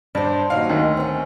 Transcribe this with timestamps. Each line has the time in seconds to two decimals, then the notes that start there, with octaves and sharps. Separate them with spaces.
0.15 G2 D4 C5
0.50 D#2 F#3 D#4 F5
0.69 D2 D#3
0.97 C4 C#4